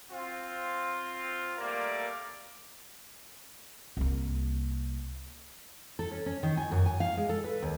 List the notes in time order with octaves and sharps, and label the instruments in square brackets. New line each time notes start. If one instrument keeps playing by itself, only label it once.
[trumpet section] C4 F4
G3 A3 A#3 A#4 D5
[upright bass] C2 A#3
[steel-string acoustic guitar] A4
C#4
C#4
D#3
G#5
F#2
G#5
F5
G#3
A4
B4
D#2